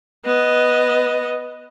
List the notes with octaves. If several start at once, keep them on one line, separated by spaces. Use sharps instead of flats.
B3 D#5